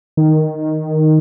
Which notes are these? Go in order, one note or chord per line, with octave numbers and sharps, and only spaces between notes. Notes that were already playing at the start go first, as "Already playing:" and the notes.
D#3